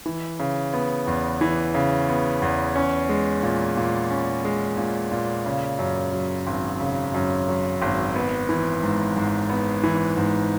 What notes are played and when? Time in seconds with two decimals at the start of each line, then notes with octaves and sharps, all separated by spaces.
0.06 E3
0.39 C#3
0.74 B3
1.07 E2
1.41 E3
1.74 C#3
2.09 B3
2.42 E2
2.76 C#4
3.09 G#3
3.43 A#2
3.77 A#2
4.10 C#4
4.45 G#3
4.77 A#2
5.12 A#2
5.46 C#3
5.79 F#2
6.13 F#3
6.47 G#1
6.80 C#3
7.14 F#2
7.48 F#3
7.82 G#1
8.16 B3
8.49 E3
8.83 G#2
9.16 G#2
9.50 B3
9.83 E3
10.17 G#2